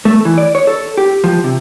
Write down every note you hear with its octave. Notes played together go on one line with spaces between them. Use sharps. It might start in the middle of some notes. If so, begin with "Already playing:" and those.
A3
E3
D5
C#5
A4
G4
F3
C3